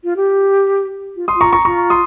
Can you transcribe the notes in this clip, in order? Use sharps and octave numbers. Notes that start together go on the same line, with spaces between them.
F4
G4
F4
C6 D#6
F4
A#5 C#6
A#5 C#6
F4 A#5 C#6
C6 D#6